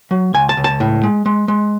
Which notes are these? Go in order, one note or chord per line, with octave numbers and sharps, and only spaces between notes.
F#3
C#2 G#5
A5
C#2
A5
A2
G#3
G#3
G#3